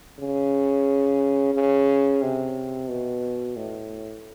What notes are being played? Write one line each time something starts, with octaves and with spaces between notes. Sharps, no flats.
C#3
C#3
C3
B2
A2